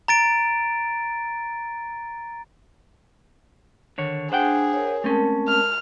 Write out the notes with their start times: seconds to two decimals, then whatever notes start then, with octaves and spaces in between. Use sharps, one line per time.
0.08 A#5 A6 D7
3.98 D3 D#3 C#5
4.32 D4 G#4 C5 F#5 G5
4.73 A#4 C#5
5.04 G#3 A3 C4 C#4 A#4 A5
5.48 F6